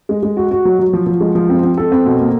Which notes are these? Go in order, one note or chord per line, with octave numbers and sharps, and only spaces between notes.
G#3
G#3
F#4
F#4
F#3
F#3
F3
F3
G#3
F3
C4
C4
A4
C4
B2
A#3